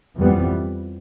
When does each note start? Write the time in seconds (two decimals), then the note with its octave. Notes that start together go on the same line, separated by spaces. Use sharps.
0.18 F2 E3 G3 B3